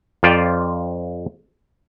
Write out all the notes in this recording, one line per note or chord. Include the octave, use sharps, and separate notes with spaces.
F2 F4 C5 D5 F5 G5